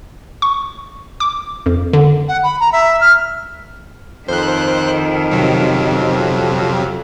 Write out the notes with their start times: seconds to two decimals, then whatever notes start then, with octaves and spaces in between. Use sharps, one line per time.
0.42 C#6
1.20 D6
1.66 F2
1.93 D3
2.28 F#5
2.43 B5
2.60 A#5
2.72 E5
3.01 F6
4.28 F2 D#3 C5 F#6
5.31 C3 F#3